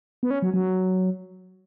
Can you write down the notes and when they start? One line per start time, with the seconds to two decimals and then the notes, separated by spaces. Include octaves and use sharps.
0.23 B3
0.31 C#4
0.42 F#3
0.54 F#3